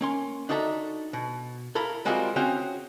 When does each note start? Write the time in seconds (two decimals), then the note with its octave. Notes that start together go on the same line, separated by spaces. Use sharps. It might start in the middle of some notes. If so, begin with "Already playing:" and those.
0.01 A#3 C#4 C6
0.49 D4 D#4 F#4 A4 E5 A#5
1.13 B2
1.75 E4 A4 A#4 F5 B5
2.05 G3 G#3 A#3 C4 F4 F#4
2.36 C4 C#4 F#4 G#4 F5 G5